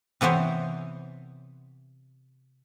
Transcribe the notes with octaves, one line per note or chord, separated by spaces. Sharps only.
C3 E3 B3 C5 C#5